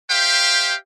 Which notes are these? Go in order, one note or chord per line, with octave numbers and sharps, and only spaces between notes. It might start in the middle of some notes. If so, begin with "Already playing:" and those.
G4 C5 E5 F5 G5